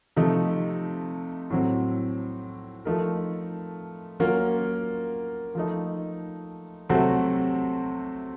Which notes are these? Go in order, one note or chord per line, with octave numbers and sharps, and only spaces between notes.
C3 F3 A3 D#4
A2 F#3 C4
F3 A3 D#4 A#4
F#3 A#3 C#4 F4 A#4
F3 A3 D#4
C3 F#3 A3 C4 F#4